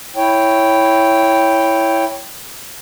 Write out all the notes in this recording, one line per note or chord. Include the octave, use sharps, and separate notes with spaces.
E4 C#5 G5